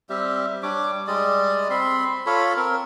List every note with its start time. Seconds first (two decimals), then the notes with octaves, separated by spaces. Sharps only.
0.10 G3 C4 G4 E5
0.63 G3 D4 C#5 D6
1.07 G3 G#3 D5 D#5
1.70 C4 B5 C6
2.26 F4 A4 C#5 B5
2.57 C4 A#4